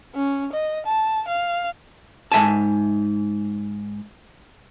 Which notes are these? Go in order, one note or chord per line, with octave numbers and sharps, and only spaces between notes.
C#4
D#5
A5
F5
G#2 E5 G#5 A5